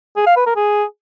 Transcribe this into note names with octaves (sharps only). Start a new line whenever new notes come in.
G#4
F5
B4
A#4
G#4